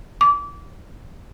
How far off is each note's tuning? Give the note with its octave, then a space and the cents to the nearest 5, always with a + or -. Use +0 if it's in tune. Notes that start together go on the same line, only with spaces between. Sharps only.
D6 -30